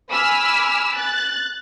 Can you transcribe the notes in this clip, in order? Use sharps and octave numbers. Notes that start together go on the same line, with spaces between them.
G#5 B5 D6 E6 F6
F#6 A6